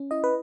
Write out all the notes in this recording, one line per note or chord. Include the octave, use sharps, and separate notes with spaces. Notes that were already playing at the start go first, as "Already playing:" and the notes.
Already playing: C#4
E4 D#5
B4